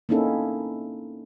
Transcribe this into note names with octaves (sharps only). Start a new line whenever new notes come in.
A#3 C4 C#4 D#4 E4 A4